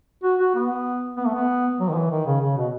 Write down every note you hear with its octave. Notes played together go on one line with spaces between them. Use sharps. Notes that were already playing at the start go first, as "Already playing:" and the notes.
F#4
F#4
B3
B3
A3
B3
F#3
D#3
E3
D#3
C#3
C#3
B2